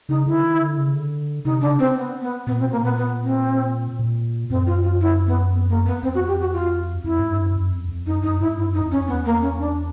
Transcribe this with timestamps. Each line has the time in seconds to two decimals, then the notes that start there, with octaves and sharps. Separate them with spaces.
0.09 C#3 D#4
0.26 D3 E4
0.43 D#3
0.60 D3
0.77 C#3
0.94 D3
1.45 C3 D#4
1.61 C#3 D4
1.79 C4
1.96 B3
2.21 B3
2.47 A#2 B3
2.60 C4
2.63 B2
2.72 A#3
2.81 A#2 B3
2.97 B3
3.23 C4
3.99 A#2
4.50 F#2 C4
4.67 F4
4.83 F4
5.01 E4
5.27 B3
5.52 B3
5.69 A#3
5.86 B3
6.03 F2 C4
6.15 F#4
6.28 G4
6.40 F#4
6.53 F4
7.04 F2 E4
7.19 G#2
7.30 G2
7.42 F#2
7.55 F#2
7.72 F2
7.88 F2
8.06 F#2 D#4
8.22 F#2 D#4
8.40 G#2 E4
8.57 G2 E4
8.69 F#2 D#4
8.82 F2
8.91 C#4
8.94 F2
9.07 E2 B3
9.25 A#3
9.41 C#4
9.58 D4